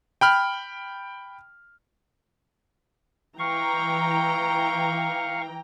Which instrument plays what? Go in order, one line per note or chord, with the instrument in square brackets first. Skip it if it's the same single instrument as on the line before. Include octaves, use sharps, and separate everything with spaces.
[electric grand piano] G5 B5 F6
[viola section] E3 G5 A#5 [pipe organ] F5 C#6